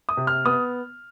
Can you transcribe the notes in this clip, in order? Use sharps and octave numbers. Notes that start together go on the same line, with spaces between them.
D#6
C3
F6
B3 D#6